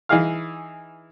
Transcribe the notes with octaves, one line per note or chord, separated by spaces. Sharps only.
E3 D#4 E4 G#4 F5 F6